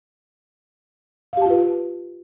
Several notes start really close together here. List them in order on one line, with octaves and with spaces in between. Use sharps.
F5 G4 A5 F4 B4